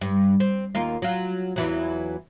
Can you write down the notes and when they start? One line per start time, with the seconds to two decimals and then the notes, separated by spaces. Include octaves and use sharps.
0.01 G2
0.40 C4
0.75 D#2 A#3 F4
1.02 F#3 F4
1.56 E2 E3 F#3